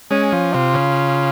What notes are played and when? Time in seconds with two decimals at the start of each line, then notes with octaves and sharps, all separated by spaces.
0.11 G#3 C#4
0.32 F3
0.53 C3 F4
0.74 C#3